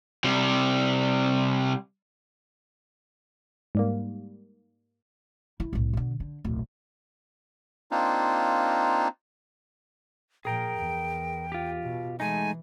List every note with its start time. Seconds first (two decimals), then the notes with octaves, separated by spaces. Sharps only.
0.24 C3 G3
3.75 G#2 G3 A#3
5.60 E4
5.73 C2 A2
5.93 B2 D3
6.20 D3
6.45 D1 B1
7.91 A#3 C4 D4 D#4 F4
10.45 A#2 F3 G#4 A#4 G5
10.77 E2
11.52 F4 G4
11.83 B2
12.20 E3 G#3 A3 D#4 G#5